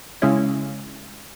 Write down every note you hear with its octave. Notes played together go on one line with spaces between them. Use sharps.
C#3 G#3 C#4 E4